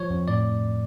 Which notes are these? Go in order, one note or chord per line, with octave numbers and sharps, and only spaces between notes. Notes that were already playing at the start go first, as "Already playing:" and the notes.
Already playing: F3 C#5
F2
A2 D5